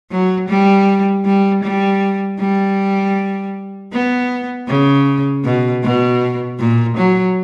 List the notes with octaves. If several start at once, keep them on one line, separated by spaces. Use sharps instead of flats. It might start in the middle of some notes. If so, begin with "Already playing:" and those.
F#3
G3
G3
G3
G3
B3
C#3
B2
B2
A#2
F#3